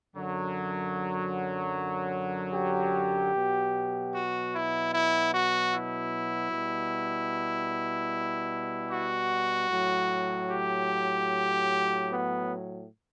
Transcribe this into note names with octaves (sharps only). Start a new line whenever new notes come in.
F#2 D3 F#3
G4
B2 F#3
F#4
E4
E4
F#4
E4
B2 G3
F#4
A2 F#3
G4
B3